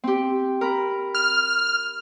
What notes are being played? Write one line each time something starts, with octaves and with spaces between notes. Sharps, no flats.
C4 G4
A#4 B5
F6